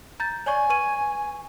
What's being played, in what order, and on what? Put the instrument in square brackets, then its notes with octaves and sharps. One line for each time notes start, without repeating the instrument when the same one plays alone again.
[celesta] A#5 G6 A6
[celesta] C#5 D5 C#6 [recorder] G#5
[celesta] B4 C#6 D#7